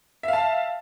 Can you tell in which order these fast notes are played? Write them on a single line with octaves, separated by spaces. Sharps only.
E5 F5 A5